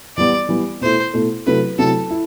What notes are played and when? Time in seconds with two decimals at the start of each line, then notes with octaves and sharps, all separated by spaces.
0.17 E3 G3 B3 D5
0.49 E3 G3 B3
0.81 B2 A3 E4 C5
1.14 B2 A3 E4
1.46 C3 F#3 A3 E4 B4
1.78 C3 F#3 A3 E4 A4
2.10 E4